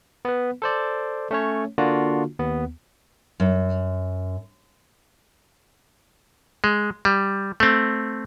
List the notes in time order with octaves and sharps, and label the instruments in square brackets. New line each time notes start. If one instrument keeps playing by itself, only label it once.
[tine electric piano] B3 B4
A4 C5 D5
A3 C#4 C#5
D3 A#3 D4 F4 F#4
D#2 B3
[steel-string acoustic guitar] F#2
[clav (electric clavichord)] G#3
G3
A3 C4